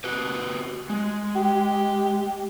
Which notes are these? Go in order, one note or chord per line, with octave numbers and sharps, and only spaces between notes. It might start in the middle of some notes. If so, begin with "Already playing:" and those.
F#4 G4 B4
G#3
G4